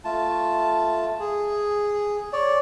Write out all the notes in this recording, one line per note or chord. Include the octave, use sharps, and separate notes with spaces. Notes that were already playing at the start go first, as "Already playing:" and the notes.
A3 F4 A5
G#4
C#5 D5